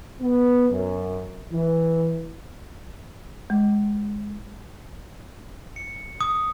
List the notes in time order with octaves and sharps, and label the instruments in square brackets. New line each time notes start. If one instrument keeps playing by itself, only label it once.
[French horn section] B3
F#2
E3
[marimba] G#3
[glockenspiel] C#7
D#6